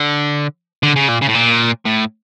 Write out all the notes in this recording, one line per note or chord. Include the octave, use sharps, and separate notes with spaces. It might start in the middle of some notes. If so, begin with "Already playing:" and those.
Already playing: D3
D3
C#3
A#2
C#3
A2
A#2
A2